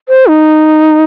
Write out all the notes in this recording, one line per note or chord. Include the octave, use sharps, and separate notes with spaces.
C5
D#4